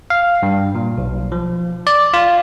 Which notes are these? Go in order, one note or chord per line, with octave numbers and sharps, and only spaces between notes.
F5
G2
A#2
B1
F3
D5
F4